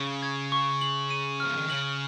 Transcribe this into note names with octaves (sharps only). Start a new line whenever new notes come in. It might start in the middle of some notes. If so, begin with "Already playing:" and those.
Already playing: C#3 C#6
G#6
C#6
F#7
D#7
F3 F6
D#3
C#3 F#7